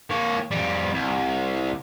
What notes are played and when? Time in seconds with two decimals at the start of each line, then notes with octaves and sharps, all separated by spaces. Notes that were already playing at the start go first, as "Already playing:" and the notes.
0.10 A#3 C#5
0.51 F2 G3
0.93 C2